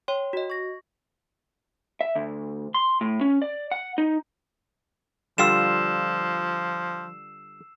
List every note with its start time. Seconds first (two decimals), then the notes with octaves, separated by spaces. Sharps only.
0.08 C#5 G5 C6
0.33 F#4 D#5
0.50 C#6 A#6
2.01 E5
2.15 D2
2.74 C6
3.01 A2
3.21 C#4
3.42 D5
3.71 F#5
3.98 D#4
5.38 D3 F3 G3 F4 E6 C7 E7